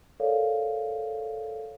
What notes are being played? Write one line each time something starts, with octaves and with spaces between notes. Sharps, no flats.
A4 A#4 C#5 D5 F5